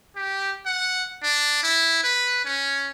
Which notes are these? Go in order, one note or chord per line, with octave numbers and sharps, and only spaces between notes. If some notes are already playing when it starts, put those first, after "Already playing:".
G4
F#5
D4
E4
B4
C#4